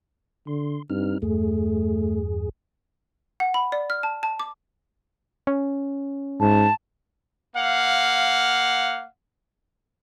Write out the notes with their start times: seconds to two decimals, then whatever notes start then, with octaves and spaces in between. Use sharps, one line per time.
0.47 D3 C6
0.90 G2 C4 D#4 F6
1.22 E2 G2 A3 G#4
3.40 F#5
3.54 B5
3.72 D5
3.90 F6
4.03 A5
4.23 A5
4.40 D6
5.47 C#4
6.40 G#2 A5
7.55 A#3 F5 F#5